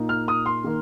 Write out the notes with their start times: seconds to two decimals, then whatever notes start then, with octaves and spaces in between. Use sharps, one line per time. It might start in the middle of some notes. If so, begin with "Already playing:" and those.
Already playing: A#2 A#3 D#4
0.09 F6
0.28 D#6
0.46 C6
0.64 D#3 A#3